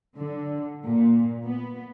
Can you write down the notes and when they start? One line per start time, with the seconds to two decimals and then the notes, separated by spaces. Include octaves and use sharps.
0.15 D3
0.84 A#2
1.45 B3